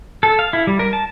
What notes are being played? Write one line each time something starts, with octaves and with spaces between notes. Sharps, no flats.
A4
F5
E4
G3
A#4
A5